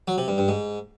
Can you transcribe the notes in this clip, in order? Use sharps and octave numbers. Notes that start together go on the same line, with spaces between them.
F#3
C3
G2
G2
G#2